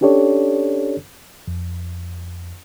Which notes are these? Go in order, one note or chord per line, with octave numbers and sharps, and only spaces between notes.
C#4 D4 G4 A4 C#5 D5
F2